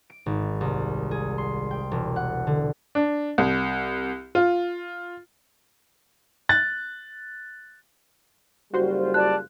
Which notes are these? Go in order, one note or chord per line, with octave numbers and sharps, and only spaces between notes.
D7
G#1
C2
G#4
C6
G5
E1
F#5
D3
D4
C2
F4
F#6 A6
F#1 G3 F4 F#4 C5
D5 A5 F#6